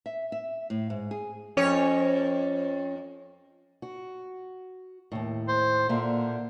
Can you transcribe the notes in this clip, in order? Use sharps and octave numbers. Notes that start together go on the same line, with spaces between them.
E5
E5
A2
G#2
G#4
F2 C#4 C#5
F#4
D#2 A2
C5
A#2 D3 A#3 E5